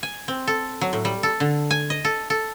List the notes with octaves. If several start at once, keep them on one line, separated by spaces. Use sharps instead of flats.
G#5
C4
A4
F#3
A2
G3
A4
D3
G#5
D#5
A4
A4